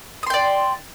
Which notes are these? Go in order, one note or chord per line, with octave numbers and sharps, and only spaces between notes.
D5 G5 C6 D#6